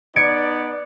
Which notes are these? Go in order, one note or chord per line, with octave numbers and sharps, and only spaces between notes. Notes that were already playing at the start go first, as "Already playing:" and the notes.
B3 D#4 D5 G#6 C#7 D7